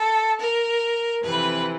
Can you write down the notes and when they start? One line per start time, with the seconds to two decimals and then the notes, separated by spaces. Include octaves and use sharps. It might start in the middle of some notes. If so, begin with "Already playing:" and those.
Already playing: A4
0.38 A#4
1.21 F2 C3 E3 B4